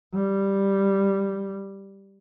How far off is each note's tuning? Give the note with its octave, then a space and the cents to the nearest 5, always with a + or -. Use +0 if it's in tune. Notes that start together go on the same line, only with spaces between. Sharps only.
G3 +0